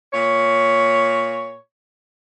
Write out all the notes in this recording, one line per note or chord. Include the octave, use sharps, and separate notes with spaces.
A#2 C#5